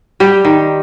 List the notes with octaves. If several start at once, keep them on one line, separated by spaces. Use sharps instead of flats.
G3 G4
D#3